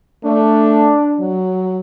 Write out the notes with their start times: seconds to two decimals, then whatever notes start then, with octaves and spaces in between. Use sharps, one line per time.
0.24 A3 D4
1.20 F#3